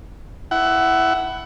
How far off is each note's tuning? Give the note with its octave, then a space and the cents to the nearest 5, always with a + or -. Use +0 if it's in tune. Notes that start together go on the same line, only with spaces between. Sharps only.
E4 +0 F#5 +20